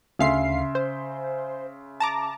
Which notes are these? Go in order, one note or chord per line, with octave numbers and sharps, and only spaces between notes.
D2 C#3 E5 F5 C6 C7
C5
A5 A#5 D6